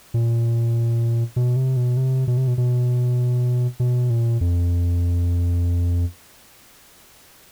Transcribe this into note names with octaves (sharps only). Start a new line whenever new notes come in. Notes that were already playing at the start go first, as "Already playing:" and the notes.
A#2
B2
C3
B2
C3
B2
C3
B2
B2
B2
A#2
F2